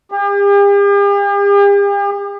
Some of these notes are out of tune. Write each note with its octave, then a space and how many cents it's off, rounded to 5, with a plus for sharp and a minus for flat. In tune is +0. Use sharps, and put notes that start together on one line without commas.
G4 +45